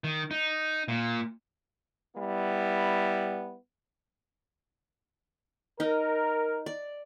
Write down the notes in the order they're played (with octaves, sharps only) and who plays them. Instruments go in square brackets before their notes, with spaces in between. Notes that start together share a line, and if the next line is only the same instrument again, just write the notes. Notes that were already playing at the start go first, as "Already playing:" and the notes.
[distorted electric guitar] D#3
D#4
A#2
[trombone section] G3 B3 E4
[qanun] D#4 [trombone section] A#4
[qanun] D5